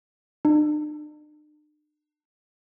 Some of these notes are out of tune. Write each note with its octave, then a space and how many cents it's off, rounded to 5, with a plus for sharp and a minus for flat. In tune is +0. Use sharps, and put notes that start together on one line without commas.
D4 +45